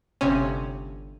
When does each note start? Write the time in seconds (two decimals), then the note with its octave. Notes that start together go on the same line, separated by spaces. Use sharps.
0.21 G1 C3 C#4